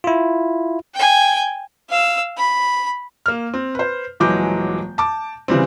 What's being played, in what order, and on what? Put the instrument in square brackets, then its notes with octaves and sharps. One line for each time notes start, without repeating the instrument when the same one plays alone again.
[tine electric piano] E4 F4
[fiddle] G5 G#5
F5 E6
B5
[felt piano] A#3 F6
C4
B4 C5
D#1 E3 F#3 G#3 D6 G6
A5 D6
C#3 E3 G3 C4